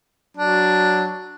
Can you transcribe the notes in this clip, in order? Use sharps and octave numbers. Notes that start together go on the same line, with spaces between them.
F#3 D4